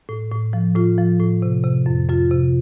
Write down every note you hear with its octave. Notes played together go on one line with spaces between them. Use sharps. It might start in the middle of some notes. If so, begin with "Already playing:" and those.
A2
A2
F3
A2 F4
F3
A2
C3
C3
F2
F2 F4
C3